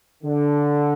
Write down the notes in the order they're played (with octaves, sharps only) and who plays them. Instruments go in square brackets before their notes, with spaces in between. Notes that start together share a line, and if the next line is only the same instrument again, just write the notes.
[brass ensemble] D3